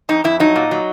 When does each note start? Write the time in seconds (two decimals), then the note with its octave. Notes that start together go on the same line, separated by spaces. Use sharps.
0.09 F2 D#4
0.24 F2 E4
0.40 F#3 D#4
0.56 A#2
0.71 F#3